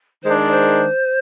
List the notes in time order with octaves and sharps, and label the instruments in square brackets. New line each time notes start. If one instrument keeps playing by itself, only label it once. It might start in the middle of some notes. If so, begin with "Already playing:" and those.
[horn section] D#3 G#3 D4 [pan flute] C5
[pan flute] D5
C5